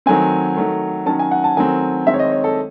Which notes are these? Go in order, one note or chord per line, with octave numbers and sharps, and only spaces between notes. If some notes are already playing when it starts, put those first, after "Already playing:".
D#3 F#3 A3 C4 G#5
D#3 F#3 A3
D#3 F#3 C#4 A5
G#5
F#5
A5
D#3 F#3 A3 C4 G#5
D#3 G#3 C4 E5
C#5
D#5
C#5
A4